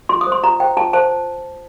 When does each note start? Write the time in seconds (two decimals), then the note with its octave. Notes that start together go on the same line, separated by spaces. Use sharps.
0.09 F4 C6
0.21 D#6
0.27 C5
0.32 C6
0.43 F4 A#5
0.60 C5 G5
0.77 F4 A5
0.93 C5 A5